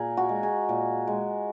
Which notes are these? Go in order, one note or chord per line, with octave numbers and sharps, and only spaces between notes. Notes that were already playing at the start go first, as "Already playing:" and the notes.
Already playing: A#2 G#4 A#4
F#4
G#3
G#4
A#2
G#3